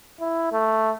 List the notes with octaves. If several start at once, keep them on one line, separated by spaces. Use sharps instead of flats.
E4
A3